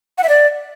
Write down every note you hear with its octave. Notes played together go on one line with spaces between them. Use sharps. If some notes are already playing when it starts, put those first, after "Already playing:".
F#5
E5
D5